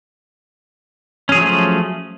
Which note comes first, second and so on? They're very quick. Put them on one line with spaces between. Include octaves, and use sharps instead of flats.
C#4 G#4 F#3 F3 A3